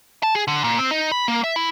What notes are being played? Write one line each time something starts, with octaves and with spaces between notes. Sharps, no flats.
A5
G#4
D3
A#2
C4
D#4
B5
A#3
E5
E4